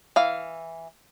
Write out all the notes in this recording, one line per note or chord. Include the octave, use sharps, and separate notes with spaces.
E3 F5